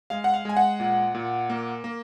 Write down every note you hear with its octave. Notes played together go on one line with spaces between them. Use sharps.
G#3 F5
F#5
F5
G#3 G#5
F#5
A#2
A#2
A#3
A#3